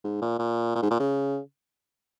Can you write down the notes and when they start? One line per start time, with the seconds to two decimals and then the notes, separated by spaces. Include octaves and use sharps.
0.04 G#2
0.22 A#2
0.39 A#2
0.75 A#2
0.82 G#2
0.91 A#2
1.00 C#3